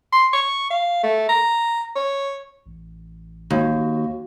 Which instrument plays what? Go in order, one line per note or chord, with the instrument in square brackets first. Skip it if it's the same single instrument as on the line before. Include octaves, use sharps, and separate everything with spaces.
[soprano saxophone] C6
C#6
F5
A3
A#5
C#5
[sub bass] A1
[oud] D#2 [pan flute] F#4